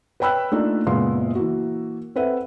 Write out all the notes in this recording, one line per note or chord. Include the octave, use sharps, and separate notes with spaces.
B4 C#5 G5 B5 E6 F#6
A3 A#3 D4 D#4 F4
F#1 A#2 G#3 B3 F5 C6
E3 A#3 F#4
C4 A4 B4 E5 F#5